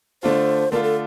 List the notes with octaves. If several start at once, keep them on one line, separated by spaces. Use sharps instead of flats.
D3 A3 D4 F4 C5
D3 A3 D4 F4 A#4
A4